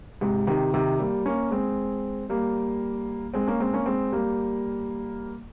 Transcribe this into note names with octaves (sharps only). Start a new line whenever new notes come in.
G#2 C3
C3 D#3
C3 D#3
G3 A#3
A#3 C#4
G#3 C4
G3 A#3
G#3 C4
A#3 C#4
G#3 C4
A#3 C#4
G#3 C4
G3 A#3